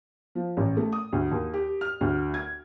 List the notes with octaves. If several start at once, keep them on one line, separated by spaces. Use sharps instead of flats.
F3
A1
A3
D#6
D2
D#2
G4
F6
D2
G#6